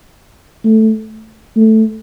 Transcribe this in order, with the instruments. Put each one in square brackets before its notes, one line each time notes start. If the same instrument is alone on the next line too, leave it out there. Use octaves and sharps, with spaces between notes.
[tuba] A3
A3